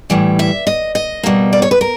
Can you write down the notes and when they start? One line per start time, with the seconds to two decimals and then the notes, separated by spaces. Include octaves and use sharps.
0.10 A2 E3 G3
0.39 E5
0.67 D#5
0.95 D#5
1.23 B2 G3 A#3
1.53 D5
1.62 C#5
1.71 B4
1.81 A#4